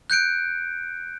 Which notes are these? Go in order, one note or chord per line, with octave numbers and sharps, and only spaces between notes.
F#6 G6 C#7 D7